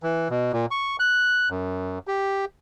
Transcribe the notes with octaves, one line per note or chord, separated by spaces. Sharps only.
E3
B2
A#2
C#6
F#6
F#2
G4